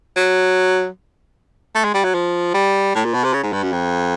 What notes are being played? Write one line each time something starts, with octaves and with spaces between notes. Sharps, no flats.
F#3
A3
G#3
G3
F#3
F3
G3
A2
A#2
B2
C3
C#3
G#2
G2
F#2
F2